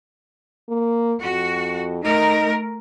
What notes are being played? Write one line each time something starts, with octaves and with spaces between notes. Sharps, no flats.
A#3
F2 F#4
A3 D#4 A#4